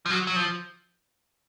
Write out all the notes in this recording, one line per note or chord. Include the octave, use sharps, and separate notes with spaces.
F3
F#3
F#3
F3